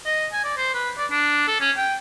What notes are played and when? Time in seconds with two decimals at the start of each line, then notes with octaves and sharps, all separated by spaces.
0.06 D#5
0.33 G#5
0.44 D5
0.57 C5
0.74 B4
0.98 D5
1.11 D4
1.48 A4
1.61 C#4
1.77 G5